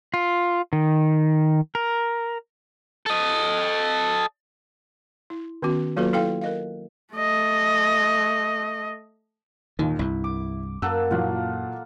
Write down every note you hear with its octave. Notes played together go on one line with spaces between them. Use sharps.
F4
D#3
A#4
A4 D#5
E4
D#3 B3 C#4 F#4
F#3 A#3 F4 F#4 A4 B4
E4 A4 F5 G5
A#4 D#5 F5
A3 D#5
D#2 A#2 D#3
C2 G2 E4
D6
F#2 A#3 A4 F#5 E6
A#2 E3 F#3 F4 F#5